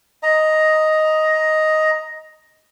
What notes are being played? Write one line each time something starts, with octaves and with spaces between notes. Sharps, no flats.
D#5 A#5